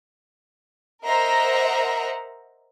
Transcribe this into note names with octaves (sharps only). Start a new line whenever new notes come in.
A#4 C5 D#5 E5 F#5 A#5